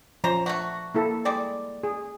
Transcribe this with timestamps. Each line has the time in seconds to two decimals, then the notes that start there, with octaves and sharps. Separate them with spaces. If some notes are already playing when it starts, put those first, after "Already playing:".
0.24 F3 C#4 C5 A#5
0.46 A3 D4 F#4
0.94 A#3 E4 A4
1.25 G3 G#3 D5
1.83 G#4